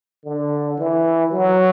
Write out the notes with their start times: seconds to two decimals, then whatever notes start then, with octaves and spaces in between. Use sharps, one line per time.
0.25 D3
0.78 E3
1.32 F#3